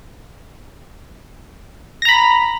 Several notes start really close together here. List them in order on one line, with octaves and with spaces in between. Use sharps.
A#6 A#5 B5